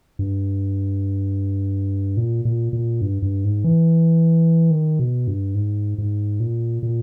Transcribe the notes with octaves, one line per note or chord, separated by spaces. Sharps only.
G2
A#2
A#2
A#2
G2
G2
G#2
E3
D#3
B2
G2
G#2
G#2
A#2
A#2